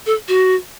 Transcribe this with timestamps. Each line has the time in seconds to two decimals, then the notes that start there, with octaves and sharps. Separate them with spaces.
0.06 A4
0.28 F#4